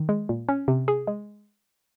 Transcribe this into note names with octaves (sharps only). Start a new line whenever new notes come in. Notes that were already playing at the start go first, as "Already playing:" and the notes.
Already playing: D#3
G#3
A#2
C#4
C3
G#4
G#3